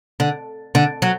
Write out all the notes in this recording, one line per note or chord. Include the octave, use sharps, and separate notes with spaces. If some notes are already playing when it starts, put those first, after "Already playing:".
D3
D3
F#3